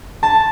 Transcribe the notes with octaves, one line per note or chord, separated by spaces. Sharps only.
A5